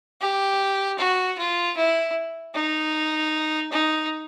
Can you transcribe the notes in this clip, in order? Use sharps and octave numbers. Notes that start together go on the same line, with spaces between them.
G4
F#4
F4
E4
D#4
D#4